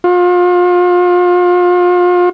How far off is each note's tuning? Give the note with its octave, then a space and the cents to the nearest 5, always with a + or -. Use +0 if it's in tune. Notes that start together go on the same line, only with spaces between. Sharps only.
F4 +35